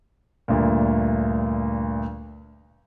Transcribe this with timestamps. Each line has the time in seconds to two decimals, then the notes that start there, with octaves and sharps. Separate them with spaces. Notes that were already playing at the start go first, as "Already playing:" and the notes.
0.48 D2 G2 A#2